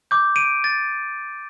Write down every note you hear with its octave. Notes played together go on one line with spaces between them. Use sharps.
D6 G6
D7 D#7
A6